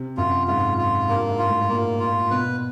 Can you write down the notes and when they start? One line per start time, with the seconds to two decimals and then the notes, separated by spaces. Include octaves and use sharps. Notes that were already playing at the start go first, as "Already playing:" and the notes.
Already playing: C3
0.17 F#2 F4
0.47 G#2 F4
0.78 F4
1.08 G2 A#3
1.29 G#2
1.39 F4
1.50 A2
1.69 A#2 A#3
2.00 F4
2.31 B2 B4